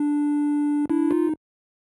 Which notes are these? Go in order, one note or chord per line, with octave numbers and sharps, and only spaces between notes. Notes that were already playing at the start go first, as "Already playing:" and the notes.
Already playing: D4
D4 E4
D#4 F4